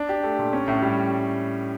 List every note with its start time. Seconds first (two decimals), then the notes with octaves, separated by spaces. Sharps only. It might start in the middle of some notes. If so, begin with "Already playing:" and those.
Already playing: D4
0.09 G4
0.24 A3
0.39 A#2
0.53 C#4
0.68 A2
0.82 G3